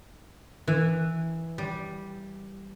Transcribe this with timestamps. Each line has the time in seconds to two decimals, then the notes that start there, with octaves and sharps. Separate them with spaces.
0.68 E3
1.58 G3